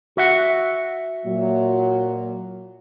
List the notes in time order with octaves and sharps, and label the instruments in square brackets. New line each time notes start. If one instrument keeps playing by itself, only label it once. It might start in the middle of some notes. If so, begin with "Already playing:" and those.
[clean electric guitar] F#4 E5 F#5
[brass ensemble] A#2 F#3